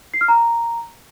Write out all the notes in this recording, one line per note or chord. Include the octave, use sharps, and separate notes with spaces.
C7
F6
A#5